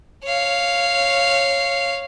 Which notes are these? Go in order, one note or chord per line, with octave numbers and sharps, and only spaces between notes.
C#5 F5